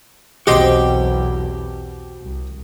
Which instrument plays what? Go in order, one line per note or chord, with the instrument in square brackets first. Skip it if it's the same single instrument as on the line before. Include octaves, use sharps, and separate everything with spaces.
[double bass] B1 E2 [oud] B2 C4 [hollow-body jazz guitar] F#4 D#5 C6 [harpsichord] G4
[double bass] C2